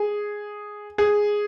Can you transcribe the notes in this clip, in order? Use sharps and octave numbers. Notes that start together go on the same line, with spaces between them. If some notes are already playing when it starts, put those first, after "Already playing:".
Already playing: G#4
G#4